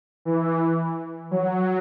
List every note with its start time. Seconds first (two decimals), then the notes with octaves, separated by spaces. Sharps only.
0.25 E3
1.31 F#3